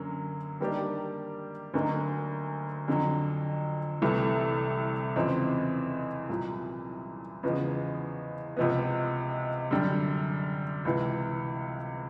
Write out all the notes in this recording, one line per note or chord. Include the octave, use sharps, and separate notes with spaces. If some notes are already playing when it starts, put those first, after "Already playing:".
Already playing: F#2 D3 F#3 A#3 C#4
D#3 G3 A#3 D4 G4
D2 D3 F#3 A#3 D#4
F2 D3 F#3
C2 C3 E3 A3
E2 C#3 F3 G#3 C4
C2 A#2 F#3
E2 C#3 F3 G#3 B3
C#2 C3 F3 G#3 B3
F#2 D3 G3
C#2 C3 E3